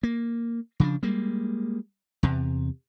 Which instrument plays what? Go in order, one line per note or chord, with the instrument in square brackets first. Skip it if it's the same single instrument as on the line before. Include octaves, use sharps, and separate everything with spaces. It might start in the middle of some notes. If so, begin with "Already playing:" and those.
[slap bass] A#3
C#3 F3 D4
G3 G#3 A#3
E2 C3